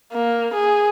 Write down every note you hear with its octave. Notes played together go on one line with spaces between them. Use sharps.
A#3
G#4